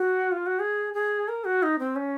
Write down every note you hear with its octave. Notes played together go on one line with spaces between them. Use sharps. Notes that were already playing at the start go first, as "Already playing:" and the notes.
Already playing: F#4
F4
F#4
G#4
G#4
A#4
F#4
D#4
C4
C#4